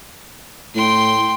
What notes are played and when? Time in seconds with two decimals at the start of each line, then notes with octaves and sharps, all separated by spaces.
0.75 A2 G5 C6